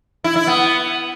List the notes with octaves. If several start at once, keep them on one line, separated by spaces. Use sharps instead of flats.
E4
E4
B3